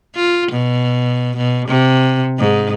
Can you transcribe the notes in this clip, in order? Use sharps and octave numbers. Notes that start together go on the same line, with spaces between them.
F4
B2
B2
C3
G#2